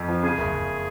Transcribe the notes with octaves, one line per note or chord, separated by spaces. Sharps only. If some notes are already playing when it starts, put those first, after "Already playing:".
Already playing: F2
F3
C#3 G#4
F#1
F#1